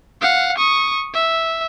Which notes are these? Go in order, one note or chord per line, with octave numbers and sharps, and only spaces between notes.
F5 F#5
C#6 D#6
E5